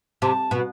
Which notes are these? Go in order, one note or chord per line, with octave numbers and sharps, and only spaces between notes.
C3 A5
B2